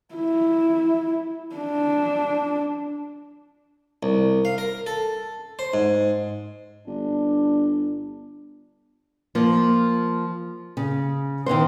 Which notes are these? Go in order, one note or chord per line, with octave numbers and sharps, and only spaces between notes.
E4
D4
C2
F5
A#4
A4
C5
G#2
G1 D4
F3 A#3
C#3
D#3 E3 B3 C5